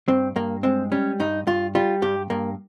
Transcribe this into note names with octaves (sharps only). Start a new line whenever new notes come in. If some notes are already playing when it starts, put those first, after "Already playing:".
G2 C4
G2 A#3
G#3 C4
G3 C#4
G2 D#4
G2 F4
G3 F4
G2 G4
G2 A#3